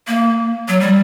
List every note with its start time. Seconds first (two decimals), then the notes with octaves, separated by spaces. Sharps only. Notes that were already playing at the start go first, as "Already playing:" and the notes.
0.07 A#3
0.68 F#3
0.80 G3